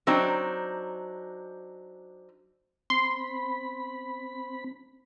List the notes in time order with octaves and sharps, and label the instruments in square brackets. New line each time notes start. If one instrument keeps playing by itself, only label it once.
[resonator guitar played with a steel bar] F#3 C4 D4 D#4
[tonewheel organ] C4 B5 [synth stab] C6